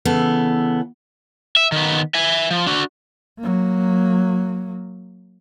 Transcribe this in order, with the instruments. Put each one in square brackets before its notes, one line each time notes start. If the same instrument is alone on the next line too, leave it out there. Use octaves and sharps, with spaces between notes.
[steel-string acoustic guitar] C#3 E3 B3 A4
[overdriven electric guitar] E5
D#3 B3
E5 G#5
F3
D4 F#4
[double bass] F#3 A#3